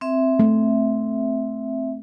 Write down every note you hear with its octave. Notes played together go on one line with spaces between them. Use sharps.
C4 E5
A3